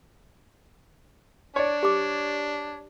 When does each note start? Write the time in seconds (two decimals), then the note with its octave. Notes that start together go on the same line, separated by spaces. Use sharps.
1.56 D4 C#5 D5
1.83 G4 D6